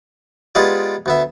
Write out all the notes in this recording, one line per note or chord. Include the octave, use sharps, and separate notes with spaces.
G#3 B3 D#4 F4 G4 D5
D2 B3 E5